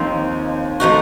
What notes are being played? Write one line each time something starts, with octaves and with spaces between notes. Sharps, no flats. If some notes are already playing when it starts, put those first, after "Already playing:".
Already playing: D#2 D#3 F3 C4 D#4
F3 A3 D#4 F#4